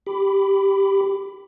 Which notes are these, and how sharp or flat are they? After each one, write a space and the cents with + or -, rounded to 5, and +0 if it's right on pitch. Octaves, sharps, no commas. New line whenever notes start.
G4 +0 B5 +15 D6 +0